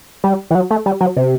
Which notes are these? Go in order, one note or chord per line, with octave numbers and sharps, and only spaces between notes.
G3
E3
F#3
A3
G3
F#3
C3